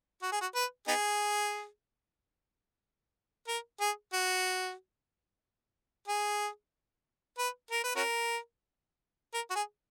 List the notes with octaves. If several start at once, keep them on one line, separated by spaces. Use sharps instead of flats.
F#4
G#4
F#4
B4
B3 D#4 G#4
A#4
G#4
F#4
G#4
B4
A#4
B4
C#4 F#4 A#4
A#4
F#4
G#4